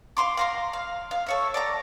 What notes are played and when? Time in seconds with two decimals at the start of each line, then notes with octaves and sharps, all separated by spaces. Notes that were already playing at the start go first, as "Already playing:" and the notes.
0.17 F5 C6 D6
0.37 F5 A#5 C6
0.73 F5
1.11 F5
1.27 A4 C#5 E5
1.54 D5 A5 A#5